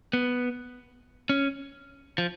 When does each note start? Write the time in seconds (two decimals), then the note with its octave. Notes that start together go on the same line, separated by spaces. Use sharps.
0.13 B3
1.29 C#4
2.18 F3